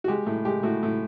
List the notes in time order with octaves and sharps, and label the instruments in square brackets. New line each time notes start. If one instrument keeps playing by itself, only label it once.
[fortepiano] F#4
G#3 G4
A2
G#3 G4
A2 F#4
A2